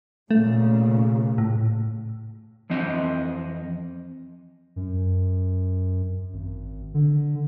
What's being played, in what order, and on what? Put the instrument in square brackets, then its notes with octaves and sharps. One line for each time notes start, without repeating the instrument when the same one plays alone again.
[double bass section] A#2 C#3 [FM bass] A3
[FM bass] A2
[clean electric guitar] F2 E3 C4 D#5
[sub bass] F#2
G#1
D3